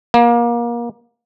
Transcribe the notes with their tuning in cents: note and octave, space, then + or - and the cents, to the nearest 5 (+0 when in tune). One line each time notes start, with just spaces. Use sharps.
A#3 +25